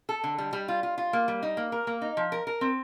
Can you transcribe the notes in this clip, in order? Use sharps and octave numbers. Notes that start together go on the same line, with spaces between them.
A4
D3
G3
G3
F4
F4
F4
A#3
G3
D#4
A#3
A#4
A#3
D#4
F3
A#4
A#4
C4